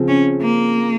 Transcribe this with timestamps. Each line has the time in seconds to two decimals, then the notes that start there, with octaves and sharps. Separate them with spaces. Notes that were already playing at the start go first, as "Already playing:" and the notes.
Already playing: C#3 F3 C4
0.08 C#4
0.42 A#3